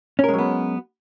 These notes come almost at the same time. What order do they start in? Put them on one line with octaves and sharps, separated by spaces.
C#4 A#4 G#3 F#3 B3